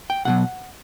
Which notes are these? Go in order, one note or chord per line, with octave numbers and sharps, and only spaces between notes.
G5
B1 B2 F#3 F#5